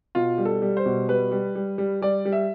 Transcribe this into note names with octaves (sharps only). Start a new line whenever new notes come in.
B2 F4
G3
A4
G3
C5
B2
G3 B4
G3
G3
G3
G3 D5
G3
E5